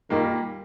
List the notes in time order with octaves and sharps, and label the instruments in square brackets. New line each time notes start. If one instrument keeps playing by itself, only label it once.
[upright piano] A#2 G3 A#3 [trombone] D#3